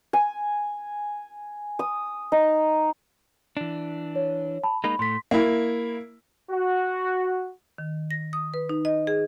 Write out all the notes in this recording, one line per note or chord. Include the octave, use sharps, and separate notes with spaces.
G#5
D#6
D#4
E3 D4
C#5
A5 B5
G#3 A#3 D#4 B5
A2 A3 C6 B6
A#3 E4
F#4
D#3
A#6
D#6
B4
D#4
D#5
G#4